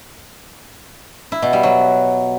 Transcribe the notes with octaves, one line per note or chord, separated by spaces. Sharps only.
E4
B2
G3
F#3